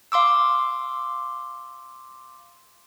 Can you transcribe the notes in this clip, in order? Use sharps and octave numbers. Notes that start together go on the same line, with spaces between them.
F5 C6 D6 E6